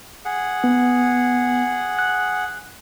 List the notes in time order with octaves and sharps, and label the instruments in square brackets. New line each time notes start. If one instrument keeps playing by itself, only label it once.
[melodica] G#4 F#5
[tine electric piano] B3
F#6